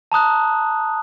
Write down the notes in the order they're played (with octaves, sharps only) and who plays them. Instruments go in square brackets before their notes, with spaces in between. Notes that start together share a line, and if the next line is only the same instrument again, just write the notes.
[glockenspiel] A5 A#5 D#6 F#6